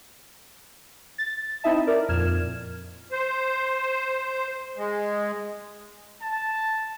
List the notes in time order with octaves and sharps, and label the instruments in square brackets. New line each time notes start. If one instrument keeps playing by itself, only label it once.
[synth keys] A6
C4 D#4 E4 D#5 E5 A5
A#4 D5
F2 A#2 F6 G#6 E7
[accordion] C5
G#3
[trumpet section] A5